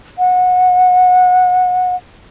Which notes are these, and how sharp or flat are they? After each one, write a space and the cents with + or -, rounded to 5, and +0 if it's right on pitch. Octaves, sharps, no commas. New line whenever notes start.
F#5 -25